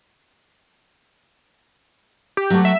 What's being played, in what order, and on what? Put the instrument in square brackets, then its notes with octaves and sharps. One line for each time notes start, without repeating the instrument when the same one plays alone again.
[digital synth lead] G4
[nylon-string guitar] F#3 G#3 A3
[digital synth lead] E5